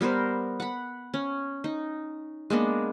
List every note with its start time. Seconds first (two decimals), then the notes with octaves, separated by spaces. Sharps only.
0.01 G3 B3 A#4 C5
0.60 F#5 B5
1.14 C#4
1.64 D#4
2.50 G#3 A#3 B3 D4